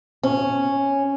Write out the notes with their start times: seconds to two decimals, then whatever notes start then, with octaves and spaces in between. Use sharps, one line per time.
0.23 C#4